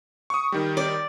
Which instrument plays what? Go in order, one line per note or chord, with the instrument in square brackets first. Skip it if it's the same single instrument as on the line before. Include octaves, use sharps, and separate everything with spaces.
[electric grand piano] C#6 D#6
D#3 G3
[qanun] D5